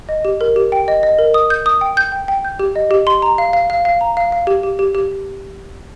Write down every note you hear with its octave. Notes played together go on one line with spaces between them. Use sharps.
D#5
G4
A#4
G4
G5
D#5
D#5
A#4
D#6
G6
D#6
G5
G6
G5
G5
G6
G4
D#5
G4
C6
A#5
F5
F5
F5
F5
A#5
F5
F5
G4
G4
G4
G4